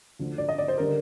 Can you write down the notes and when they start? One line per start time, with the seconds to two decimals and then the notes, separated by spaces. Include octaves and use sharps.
0.19 D2 D3 F3
0.38 D5
0.49 D#5
0.58 D5
0.68 C5
0.78 D3 G3 A#4